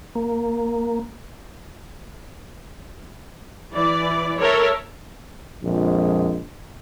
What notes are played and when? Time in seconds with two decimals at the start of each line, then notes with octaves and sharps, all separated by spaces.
0.15 A#3
3.73 E3 D5
4.40 A4 A#4 C#5 E5
5.63 A#1 F2 F3 G#3